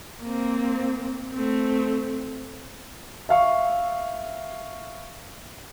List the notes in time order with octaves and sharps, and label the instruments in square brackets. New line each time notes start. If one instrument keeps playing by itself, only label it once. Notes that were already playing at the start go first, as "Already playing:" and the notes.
[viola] A#3 C4
A3 C4
[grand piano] E5 F5 C#6